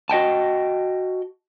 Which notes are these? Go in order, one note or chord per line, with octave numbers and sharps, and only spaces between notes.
F#4 D#5 G5 A5